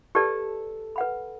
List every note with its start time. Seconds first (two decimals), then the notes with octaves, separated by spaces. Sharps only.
0.15 G4 A4 B4 D5 A5
0.96 B4 F#5 B5